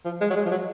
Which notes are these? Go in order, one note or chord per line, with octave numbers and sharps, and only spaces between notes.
F3
G#3
F#3
G#3
F3
F#3